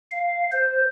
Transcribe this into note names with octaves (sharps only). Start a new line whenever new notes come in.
F5
C5